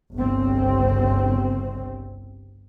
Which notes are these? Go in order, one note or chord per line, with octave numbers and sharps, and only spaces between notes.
G1 C2 C#3 C4